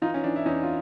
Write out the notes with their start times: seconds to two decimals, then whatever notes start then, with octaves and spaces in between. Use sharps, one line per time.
0.02 E3 D#4 F4
0.14 C#4
0.24 E3 D4
0.36 E4
0.46 E2 C#4 D#4
0.63 F4